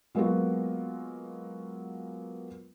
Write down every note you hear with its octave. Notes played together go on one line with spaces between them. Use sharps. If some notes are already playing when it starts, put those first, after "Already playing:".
F#3 G#3 A#3 B3 F4 F#4